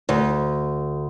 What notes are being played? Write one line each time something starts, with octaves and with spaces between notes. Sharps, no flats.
D2